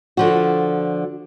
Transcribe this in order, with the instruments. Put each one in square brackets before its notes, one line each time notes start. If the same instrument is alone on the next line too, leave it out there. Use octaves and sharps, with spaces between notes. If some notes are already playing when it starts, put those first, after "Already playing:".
[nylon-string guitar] D3 F3 F#4